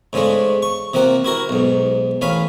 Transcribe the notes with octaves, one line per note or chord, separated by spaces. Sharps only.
G#2 C#3 G#3 A3 D4
C#6
C3 F3 A#3 F#5
E4 F#4 A#4
B1 G#2
A1 C#4 F5 B5